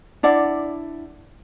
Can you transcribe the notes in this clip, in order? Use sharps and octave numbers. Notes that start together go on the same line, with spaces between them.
D4 E4 D5 F#5